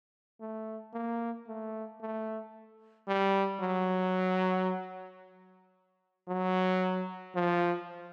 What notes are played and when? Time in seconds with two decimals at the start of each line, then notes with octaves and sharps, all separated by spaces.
0.41 A3
0.94 A#3
1.47 A3
2.01 A3
3.08 G3
3.61 F#3
6.28 F#3
7.35 F3